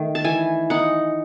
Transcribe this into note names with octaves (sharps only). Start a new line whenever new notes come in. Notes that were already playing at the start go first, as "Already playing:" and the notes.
Already playing: D#3 A3
A5
E3 G#5
D#4 F#5